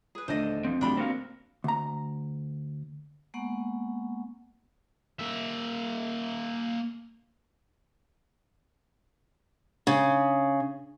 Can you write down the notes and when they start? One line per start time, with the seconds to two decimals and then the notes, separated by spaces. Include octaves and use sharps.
0.15 G#4 B4
0.28 D#1 E2 D3 A3 D4 C5 D#5
0.65 F3 C4
0.81 D1 E2 F#3 A3 D4 G4 B5
0.97 A#3 C4 F#4 F5
1.64 D2 A#5
3.34 G#3 A#3 B3 F#5 C#6
5.19 A#3 E5
9.87 C#3